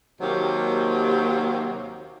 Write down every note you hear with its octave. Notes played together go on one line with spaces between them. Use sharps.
D#2 C3 F#3 A#3 G4